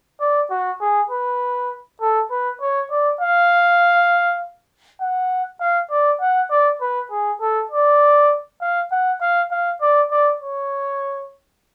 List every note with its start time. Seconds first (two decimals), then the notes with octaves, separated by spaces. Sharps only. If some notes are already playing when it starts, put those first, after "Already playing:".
0.20 D5
0.51 F#4
0.81 G#4
1.11 B4
2.01 A4
2.31 B4
2.61 C#5
2.91 D5
3.21 F5
5.01 F#5
5.60 F5
5.91 D5
6.21 F#5
6.51 D5
6.81 B4
7.11 G#4
7.41 A4
7.71 D5
8.61 F5
8.91 F#5
9.21 F5
9.51 F5
9.81 D5
10.11 D5
10.41 C#5